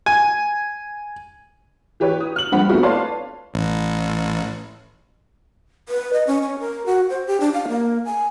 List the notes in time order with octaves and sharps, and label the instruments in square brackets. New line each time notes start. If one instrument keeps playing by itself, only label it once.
[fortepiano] G#5
[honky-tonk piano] E3 G4 B4 C#5
D#6
F6 F#7
A#1 G2 C4 F#5 B5
A3 B3 C4 D4 E4 F#4
B4 C#5 D5 F5 A5 C6
[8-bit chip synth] A1
[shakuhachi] B4
D#5
C#4
C#4
A#4
F#4
C5
G4
D4
F5
A#3
G#5